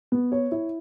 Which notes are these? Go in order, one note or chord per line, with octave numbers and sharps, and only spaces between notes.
B3
C#5
E4